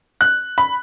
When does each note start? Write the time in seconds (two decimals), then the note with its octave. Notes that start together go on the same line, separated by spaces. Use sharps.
0.21 F#6
0.58 B5